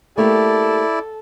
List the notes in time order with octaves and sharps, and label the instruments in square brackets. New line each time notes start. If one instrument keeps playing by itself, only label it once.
[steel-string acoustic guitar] A3 A#3 G4 [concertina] E4 D5 [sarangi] A4